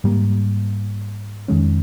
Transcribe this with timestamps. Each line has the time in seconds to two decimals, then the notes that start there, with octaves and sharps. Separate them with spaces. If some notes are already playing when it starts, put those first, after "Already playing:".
0.04 G#2 G3 A#3
1.48 F2 D#3 G#3 C#4